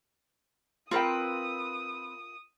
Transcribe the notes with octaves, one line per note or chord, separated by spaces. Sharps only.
C4 F4 A#4 B4 G5 D#6